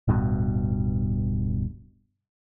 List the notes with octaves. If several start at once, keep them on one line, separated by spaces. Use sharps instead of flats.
D1 G2 B2